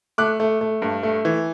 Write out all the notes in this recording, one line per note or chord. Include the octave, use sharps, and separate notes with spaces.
A3 D6 F#6
A3
A3
G2
A3
E3